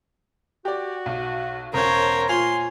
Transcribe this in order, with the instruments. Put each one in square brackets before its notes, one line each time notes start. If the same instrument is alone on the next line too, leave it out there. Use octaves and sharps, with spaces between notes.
[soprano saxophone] F#4 [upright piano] G4 D5
[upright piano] B1
[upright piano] E1 C#4 G#6 [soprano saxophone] A#4 [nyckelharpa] C5 C#5
[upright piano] A#2 F4 F7 [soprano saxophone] G#5 [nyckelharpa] C6